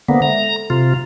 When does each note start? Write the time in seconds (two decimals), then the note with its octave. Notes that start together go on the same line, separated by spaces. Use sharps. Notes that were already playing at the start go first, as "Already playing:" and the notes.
0.08 D3 A#3 B3 A4 C5 F#5
0.22 G#3 E5 A#5
0.39 A4
0.70 C3 F4 A#5